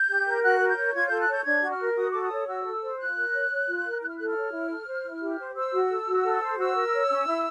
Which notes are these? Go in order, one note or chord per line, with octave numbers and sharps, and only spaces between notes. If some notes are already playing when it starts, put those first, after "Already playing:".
Already playing: G6
G4
A#4
F#4 F#6
A#4
G6
C#5
F4 G#6
A4 G6
F#6
C#5 G6
D4 G#6
F#4
F6
A#4
F#4 D#6
A4 D6
D#6
C#5
F#4 E6
A4
C5
F4 F#6
A#4
C#5
C#5
F4
A#4
E4 F#6
F6
A4 F#6
F6
C#5
E4
A4
C5
E4
G4
C5
C5 E6
F#4
A4
F#4
A4
C5
F#4 E6
A#4
C#5
C#4
E4